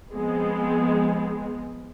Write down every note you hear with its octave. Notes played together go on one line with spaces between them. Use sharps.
F3 G#3 B3 C4